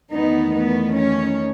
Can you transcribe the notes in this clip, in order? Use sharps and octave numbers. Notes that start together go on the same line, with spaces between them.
E2 D#3 A3 B3 D#4
B3
C#4